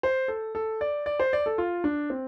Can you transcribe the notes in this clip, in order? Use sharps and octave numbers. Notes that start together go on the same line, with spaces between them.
C5
A4
A4
D5
D5
C5
D5
A4
F4
D4
C4